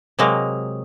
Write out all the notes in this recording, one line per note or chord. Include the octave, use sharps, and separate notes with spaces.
C3 F#3 G#3 A#3